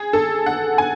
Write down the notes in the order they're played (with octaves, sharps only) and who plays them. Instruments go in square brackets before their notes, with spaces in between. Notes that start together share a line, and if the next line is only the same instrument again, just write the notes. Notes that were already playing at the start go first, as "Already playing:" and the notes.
Already playing: [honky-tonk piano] G#4
A4
F#5
G#5